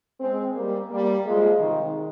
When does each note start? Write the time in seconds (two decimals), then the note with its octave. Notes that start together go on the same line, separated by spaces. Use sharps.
0.20 G#3 C4
0.55 G3 A#3
0.91 G3 A#3
1.25 F3 G#3
1.60 C3 D#3